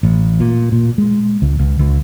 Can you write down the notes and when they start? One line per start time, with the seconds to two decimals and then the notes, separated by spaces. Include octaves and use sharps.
0.03 A1
0.40 A#2
0.72 A#2
0.98 G#3
1.42 C#2
1.59 C#2
1.79 C#2